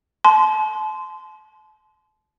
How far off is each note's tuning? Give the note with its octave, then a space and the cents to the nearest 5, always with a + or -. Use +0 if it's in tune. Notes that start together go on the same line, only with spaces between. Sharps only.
A5 -35 C6 -15